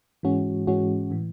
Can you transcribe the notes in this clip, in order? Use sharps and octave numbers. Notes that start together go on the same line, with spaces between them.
G#2 E3 G#3 C#4 F#4
G#2 E3 G#3 C#4 F#4
A2 E3